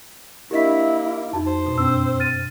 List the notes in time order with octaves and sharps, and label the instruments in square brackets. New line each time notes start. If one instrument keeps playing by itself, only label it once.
[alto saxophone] A#3 [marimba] D4 A#4 [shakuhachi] E4 [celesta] G4 D#5 B6
[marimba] F2 [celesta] D#4 F#4 A5
[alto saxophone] C5
[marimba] F#2 B2
[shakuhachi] C4 [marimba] D4 [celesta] E6
[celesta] F6 A6 D#7